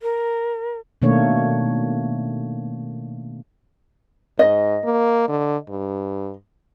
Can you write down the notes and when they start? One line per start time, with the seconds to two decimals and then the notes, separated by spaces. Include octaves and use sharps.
0.02 A#4
1.02 B2 D#3 A3 A#3 D4 C#5
4.39 G#2 D#5
4.84 A#3
5.28 D3
5.69 G2